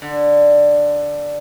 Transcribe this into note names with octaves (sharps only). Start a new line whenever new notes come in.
D3